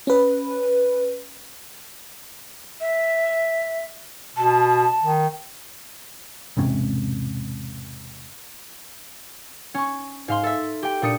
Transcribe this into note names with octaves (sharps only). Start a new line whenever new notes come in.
C#4 B4
E5
B2 A5
D#3
E1 G#2 C3 C#4
C#4 C#6
G#2 F5 C6
A4 E5
G4 G5
A#2 D4 D#6 C#7